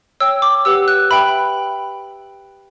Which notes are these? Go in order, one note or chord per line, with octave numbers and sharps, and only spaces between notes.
C#5 G5 E6
D6
G4 B4 F#5 E6
F#6
B4 E5 G5 B5